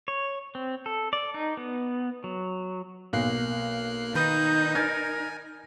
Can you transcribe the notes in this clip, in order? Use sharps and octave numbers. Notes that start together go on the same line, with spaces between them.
C#5
C4
A4
D5
D#4
B3
F#3
B1 A#3 F#6 C7
D#3 D#4 B4 D#6 G6
A#4 G#5 F6 G#6 A6